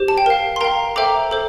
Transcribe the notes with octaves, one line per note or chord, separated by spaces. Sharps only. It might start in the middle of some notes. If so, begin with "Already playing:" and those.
Already playing: G4 C5
A5
G5
A#4 F5
C6
A#4 F5 G5 A#5
A4 C5 E5 G5 A#5 D6
A4 C5